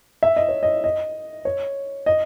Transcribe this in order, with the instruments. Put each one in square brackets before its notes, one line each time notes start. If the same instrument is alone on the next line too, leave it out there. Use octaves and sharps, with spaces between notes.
[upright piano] E5
D#5
C#5
D#5
D#5
C#5
D#5